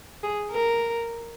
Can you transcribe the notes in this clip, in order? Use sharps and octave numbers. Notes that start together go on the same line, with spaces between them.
G#4
A#4